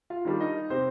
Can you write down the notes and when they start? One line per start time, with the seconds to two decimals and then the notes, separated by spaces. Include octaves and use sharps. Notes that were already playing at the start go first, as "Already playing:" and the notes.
0.10 F4 F5
0.25 D#3 G3 D4
0.40 D#4 D#5
0.70 C3 C4 C5